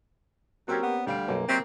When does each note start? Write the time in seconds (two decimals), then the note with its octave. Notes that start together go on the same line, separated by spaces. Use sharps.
0.68 F#3 A#3 C4 C#4 G4 A#4
0.82 B3
1.07 D2 G3 F5 D7
1.28 B1 F#2 A#3
1.49 F#3 C4 G4 D#5